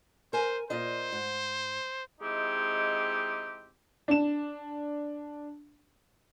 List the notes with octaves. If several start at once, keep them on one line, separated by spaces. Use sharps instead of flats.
A#4 C5 G#5
A#2 F4 C5 D#5
G#2
G#3 C4 D#4 E4 G4
D4 E7